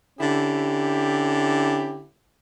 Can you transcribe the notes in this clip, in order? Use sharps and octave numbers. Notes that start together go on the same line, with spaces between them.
D3 C#4 E4 G4